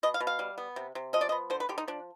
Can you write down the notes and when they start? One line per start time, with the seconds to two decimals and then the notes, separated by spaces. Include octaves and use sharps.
0.03 B2 D#5
0.14 F5
0.20 B2
0.27 F5
0.39 G3
0.58 B3
0.76 C3
0.95 C3
1.13 F3 D#5
1.21 D5
1.29 D#5
1.32 B3
1.50 D3 C5
1.60 B4
1.69 D3 G4
1.78 D#4
1.88 F3 D4